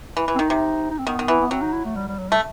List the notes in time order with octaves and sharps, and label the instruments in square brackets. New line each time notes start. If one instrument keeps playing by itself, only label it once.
[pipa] E3
E3
[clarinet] C4
[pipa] D#3 [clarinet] D#4
[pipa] C3
[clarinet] D#4
C4
[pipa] D#3 [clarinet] B3
[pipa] D#3
E3
[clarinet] B3
[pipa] F#3 [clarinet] C4
[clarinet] D#4
E4
A3
G3
G3
F#3
[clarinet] G3 [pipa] A3